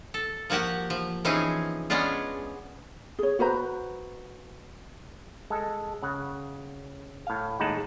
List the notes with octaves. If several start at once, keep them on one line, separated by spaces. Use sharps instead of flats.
A4
F3 A#3 F#4 G4 F#5
F3
E3 F3 C4 C#4 D#4 G#4
G#3 B3 C#4 D4 F4
G#4 C#5
F#4 B4 C5 A#5
G#3 A4
C#3 F#5
A2 F5
D#2 A2 G#3 D#4 F#5 A5